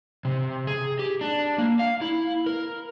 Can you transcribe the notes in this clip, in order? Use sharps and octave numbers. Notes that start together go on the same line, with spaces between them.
C3
G#4
G4
D4
A#3
F5
E4
A#4